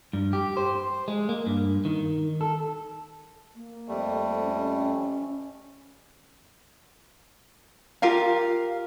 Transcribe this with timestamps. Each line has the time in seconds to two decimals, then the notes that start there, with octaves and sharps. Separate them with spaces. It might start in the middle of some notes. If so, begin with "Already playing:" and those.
0.13 G2
0.33 G4
0.57 C5
1.08 G#3
1.29 A#3
1.47 G2
1.85 D#3
2.41 A4
3.56 A#3
3.88 F2 G3 A3
4.43 C#4
8.02 F4 G4 A#4 F5